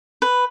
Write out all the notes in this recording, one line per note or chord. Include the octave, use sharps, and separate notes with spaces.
B4